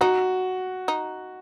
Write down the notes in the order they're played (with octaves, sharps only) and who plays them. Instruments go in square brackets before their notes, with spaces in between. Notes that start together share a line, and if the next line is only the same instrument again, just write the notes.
[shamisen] D#4 [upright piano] F#4
[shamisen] D#4